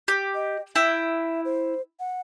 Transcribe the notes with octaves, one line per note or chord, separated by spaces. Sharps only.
G4
D#5
E4 E5 G5
C5
F#5